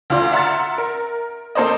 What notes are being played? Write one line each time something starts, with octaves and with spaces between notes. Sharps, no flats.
D2 F4 D5 C6
E5 F#5 A#5 C6 F6 A6
A#4
A#3 A4 C5 D5 D#5